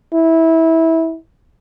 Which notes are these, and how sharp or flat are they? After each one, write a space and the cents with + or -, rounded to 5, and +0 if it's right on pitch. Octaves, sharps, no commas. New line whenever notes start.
E4 -20